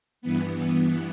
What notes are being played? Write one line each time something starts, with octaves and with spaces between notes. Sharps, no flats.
G2 E3 B3